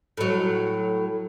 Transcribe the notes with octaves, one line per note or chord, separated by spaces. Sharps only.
A2 F#3